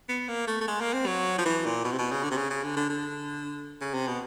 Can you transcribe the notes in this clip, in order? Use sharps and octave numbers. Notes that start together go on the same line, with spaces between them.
B3
A#3
A3
A3
G#3
A#3
C4
F#3
F3
E3
A#2
B2
C3
B2
C#3
D3
C3
C#3
C#3
D3
D3
D3
C#3
C3
B2